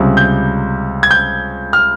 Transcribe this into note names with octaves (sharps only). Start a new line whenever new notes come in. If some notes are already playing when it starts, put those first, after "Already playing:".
Already playing: C#2 C3 G3
G6
G#6
G6
F6